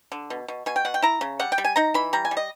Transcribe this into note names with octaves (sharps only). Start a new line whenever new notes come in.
D3
B2
B2
B2 G#5
G5
B2 F#5
G5
E4 A#5
C#3
G3 F#5
G5
G3
G#5
D#4 A#5
E3 B5
G3 A#5
G#5
G3
D#5